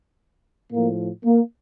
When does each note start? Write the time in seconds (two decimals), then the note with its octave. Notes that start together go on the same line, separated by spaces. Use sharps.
0.71 A2 F3 A#3
1.24 A#3